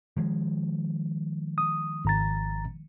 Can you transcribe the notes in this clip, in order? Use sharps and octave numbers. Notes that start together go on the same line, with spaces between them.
D#3 F3 G#3
D#6
G#1 A#5 A6